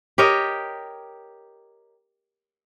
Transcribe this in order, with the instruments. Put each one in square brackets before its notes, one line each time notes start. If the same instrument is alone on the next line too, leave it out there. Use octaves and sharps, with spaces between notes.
[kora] G4 A#4 C#5 D#5